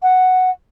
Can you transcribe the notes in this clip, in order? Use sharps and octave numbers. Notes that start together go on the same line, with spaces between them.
F#5